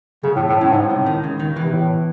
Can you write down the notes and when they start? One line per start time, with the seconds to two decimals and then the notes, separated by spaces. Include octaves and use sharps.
0.23 F#2 C#3
0.36 E2 A2
0.48 F#2 A2
0.61 C#2 A2 C#3
0.72 C#2 G#2 C#3
0.85 C2 A2 C3
1.06 D#2 D#3
1.23 C#2 C#3
1.39 D#2 D#3
1.56 E2 E3
1.62 C3
1.73 A2